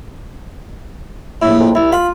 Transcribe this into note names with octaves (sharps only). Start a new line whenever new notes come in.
A#1 A2 E4
F2
C2 E4
F4 B5